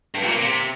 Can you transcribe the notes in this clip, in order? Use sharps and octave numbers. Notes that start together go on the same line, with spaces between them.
G2
A#2
A#3
C3